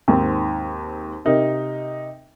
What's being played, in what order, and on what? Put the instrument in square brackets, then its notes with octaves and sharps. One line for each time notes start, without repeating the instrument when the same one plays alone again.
[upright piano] D#2 G#2 C4
C3 D#4 A#4